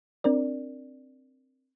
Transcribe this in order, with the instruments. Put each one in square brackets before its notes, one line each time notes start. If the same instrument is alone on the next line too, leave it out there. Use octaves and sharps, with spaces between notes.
[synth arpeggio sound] C4 D4 A#4 D5